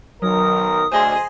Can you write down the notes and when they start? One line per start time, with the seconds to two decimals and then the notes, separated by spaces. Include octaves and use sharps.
0.22 B1 D#3 F#3 A#4 D#6
0.92 D2 G#4 C5 D#5 C6